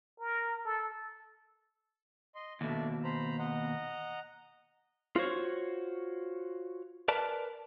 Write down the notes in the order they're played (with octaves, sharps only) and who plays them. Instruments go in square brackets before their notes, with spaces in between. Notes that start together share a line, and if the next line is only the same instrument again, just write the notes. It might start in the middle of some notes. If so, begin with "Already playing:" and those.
[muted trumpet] A#4
A4
[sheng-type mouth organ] D#5 C6
[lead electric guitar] D#2 B2 [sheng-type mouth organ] A3 D4 D5
[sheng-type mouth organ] C5 A#5 B5
D#5 F#5 A#5
[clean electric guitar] F4 F#4 C5 C#5
A#4 B4 D5 A5